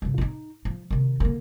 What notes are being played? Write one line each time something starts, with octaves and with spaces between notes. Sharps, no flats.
G2 C3
D#4 F4
F3
C3 D#3
D3 A#3